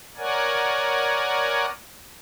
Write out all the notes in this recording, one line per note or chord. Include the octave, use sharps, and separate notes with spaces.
A#4 C#5 D5 F#5 G#5